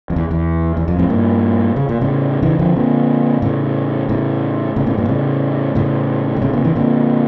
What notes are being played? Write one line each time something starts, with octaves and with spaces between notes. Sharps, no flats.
F2
E2
E2
E2
F2
F2 A2
G2 A#2
C#3
A#2
A2 C#3
C#3 E3
D3 F3
A#2 D3
A2 C#3
A2 C#3
A2 C#3
A2 C#3
G2 A#2
A2 C#3
A2 C#3
D3
A2 C#3
A#2 D3
C#3 E3
A#2 D3